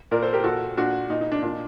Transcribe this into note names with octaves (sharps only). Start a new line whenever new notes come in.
A#2 A#4 D5
A4 C5
G4 A#4
A#2 F#4 A4
A#2 D4 F#4
A#2 D#4
D#4
D4
A#2 D4